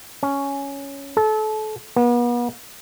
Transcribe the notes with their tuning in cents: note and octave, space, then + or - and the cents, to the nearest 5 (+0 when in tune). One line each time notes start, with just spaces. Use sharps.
C#4 +5
A4 -30
B3 -40